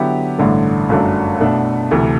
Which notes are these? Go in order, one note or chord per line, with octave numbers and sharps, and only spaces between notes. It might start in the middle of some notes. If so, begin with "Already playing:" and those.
Already playing: D3 F#3 B3 E4 G4
A1 G2 D3 A3
G1 F#2 F#3 A3 D4
B2 A3 D4
D2 C3 E3 A3